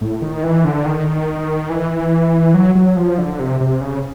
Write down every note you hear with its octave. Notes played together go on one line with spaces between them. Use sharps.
A2
D#3
E3
D3
D#3
E3
F#3
F#3
F3
D3
C3
C3
C#3